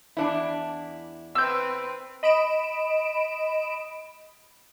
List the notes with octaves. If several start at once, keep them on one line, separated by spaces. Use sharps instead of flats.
E2 D4 E4
C4 B4 E6 G6
D#5 B5 D7 E7